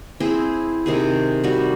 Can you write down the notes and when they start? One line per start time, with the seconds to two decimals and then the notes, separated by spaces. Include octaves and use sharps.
0.20 C4 E4 G#4
0.86 C3 D#3 G#4
1.44 G3 F#4